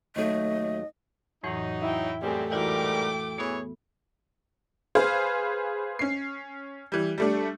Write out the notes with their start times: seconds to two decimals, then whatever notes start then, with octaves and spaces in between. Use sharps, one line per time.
0.16 D#2 F#3 A3 A4 D#5
1.43 F2 A2 E3 F#3 D#4
1.81 E4 G5
2.22 F#2 G3 A3 C4 G4 G#4
2.51 G#2 E3 G3 E4 F#4 A#4 G5 D6
3.38 E3 B3 G#4 C#5
4.95 G#4 B4 C5 F5
5.99 C#4 C7
6.92 E3 G3
7.18 G3 A3 D4